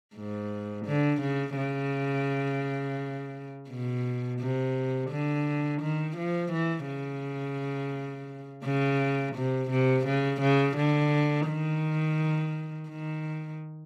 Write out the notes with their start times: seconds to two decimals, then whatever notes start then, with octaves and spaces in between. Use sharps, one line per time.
0.16 G#2
0.86 D3
1.21 C#3
1.57 C#3
3.69 B2
4.40 C3
5.11 D3
5.82 D#3
6.17 F3
6.52 E3
6.88 C#3
8.65 C#3
9.35 C3
9.71 C3
10.07 C#3
10.42 C#3
10.77 D3
11.48 D#3
12.89 D#3